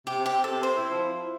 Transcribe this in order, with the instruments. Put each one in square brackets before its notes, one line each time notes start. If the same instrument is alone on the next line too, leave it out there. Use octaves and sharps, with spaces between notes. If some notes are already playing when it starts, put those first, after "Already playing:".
[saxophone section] C3 [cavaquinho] G4
[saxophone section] C4
[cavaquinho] G4
[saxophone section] C4
[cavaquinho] A4
[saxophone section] C3
[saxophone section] C4 [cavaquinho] C5
[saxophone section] E4
F3
E4
E4